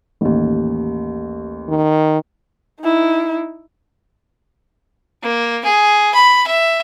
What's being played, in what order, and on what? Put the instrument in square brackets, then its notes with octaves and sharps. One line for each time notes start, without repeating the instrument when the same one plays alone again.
[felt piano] A1 D#2
[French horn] D#3
[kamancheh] D#4 E4
[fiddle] A#3
G#4
B5
E5